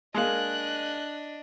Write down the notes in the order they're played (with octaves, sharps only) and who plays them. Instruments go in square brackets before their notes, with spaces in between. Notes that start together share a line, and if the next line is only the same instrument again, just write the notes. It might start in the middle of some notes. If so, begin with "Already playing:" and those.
[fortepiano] G#3 A#3 [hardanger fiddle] D4 D#5 [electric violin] F#6